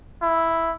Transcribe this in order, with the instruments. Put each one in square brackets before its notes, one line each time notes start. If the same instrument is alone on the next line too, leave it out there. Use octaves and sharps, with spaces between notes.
[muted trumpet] E4